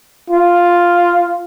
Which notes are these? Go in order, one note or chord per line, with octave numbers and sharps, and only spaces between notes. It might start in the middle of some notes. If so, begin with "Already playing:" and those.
F4